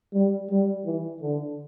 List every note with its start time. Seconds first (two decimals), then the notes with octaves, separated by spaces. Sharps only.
0.14 G3
0.51 G3
0.85 E3
1.22 D3